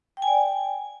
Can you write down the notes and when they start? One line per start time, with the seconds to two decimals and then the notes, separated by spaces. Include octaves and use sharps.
0.17 G5
0.22 G#5
0.28 D5